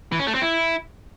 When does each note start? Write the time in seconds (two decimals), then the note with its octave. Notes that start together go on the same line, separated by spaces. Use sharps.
0.12 E3
0.19 C#4
0.27 A3
0.34 C4
0.42 E4